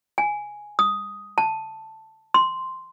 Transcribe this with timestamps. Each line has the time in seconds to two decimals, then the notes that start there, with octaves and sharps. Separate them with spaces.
0.18 G#5
0.79 D#6
1.38 A5
2.34 C6